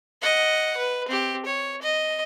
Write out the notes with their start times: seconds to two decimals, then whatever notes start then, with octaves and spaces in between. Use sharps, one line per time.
0.22 D#5 F#5
0.77 B4
1.08 C4 G4
1.45 C#5
1.81 D#5